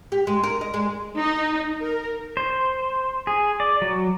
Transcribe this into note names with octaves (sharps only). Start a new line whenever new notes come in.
G4
G#3
A#4
D#5
G#3
D#4
A#4
C5
G#4
D5
F#3